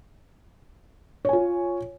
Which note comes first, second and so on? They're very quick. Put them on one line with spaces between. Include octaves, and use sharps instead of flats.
C#5 G#5 F4